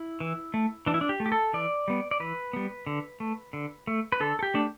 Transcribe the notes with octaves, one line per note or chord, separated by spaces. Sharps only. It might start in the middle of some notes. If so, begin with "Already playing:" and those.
Already playing: E4
E3
A3
E3 D4
E4
D4
G4
A3
G4
A4
E3 D5
G3 B3
D5
E3 B4
G3 B3
D3
A3
D3
A3
B4
D3 A4
A4
G4
A3 D4